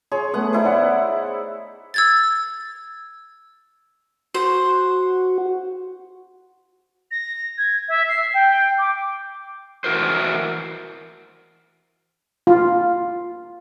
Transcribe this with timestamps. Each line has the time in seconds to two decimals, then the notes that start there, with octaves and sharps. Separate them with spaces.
0.12 G#4 C#5 C6
0.34 A3 B3 F#5 D#6
0.53 D#4 E4 C5
0.65 C#5 D5 F#5
1.94 E6 G#6 A6
4.34 F#4 C5
7.11 A#6
7.58 G#6
7.88 E5
8.09 C7
8.34 G5
8.78 D6
9.84 E3 F#4 A#4 C5
12.47 F4